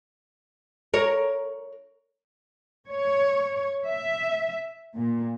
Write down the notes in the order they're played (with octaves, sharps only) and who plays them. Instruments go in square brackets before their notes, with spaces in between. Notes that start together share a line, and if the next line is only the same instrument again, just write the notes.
[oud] A#4 C#5
[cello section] C#5
E5
A#2